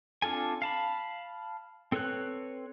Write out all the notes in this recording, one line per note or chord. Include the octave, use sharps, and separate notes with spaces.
C4 D4 F4 A4 G#5
F5 A5 B5
C4 A4 B4 C#5 F#6